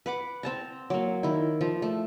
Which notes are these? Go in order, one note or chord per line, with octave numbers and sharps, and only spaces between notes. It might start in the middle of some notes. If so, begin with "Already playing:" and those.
B4 F#5 D6
C4 A5 A#5
F#3 A#3
D#3 E4
F3
A3